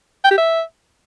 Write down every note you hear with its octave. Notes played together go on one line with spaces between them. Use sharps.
G5
G4
E5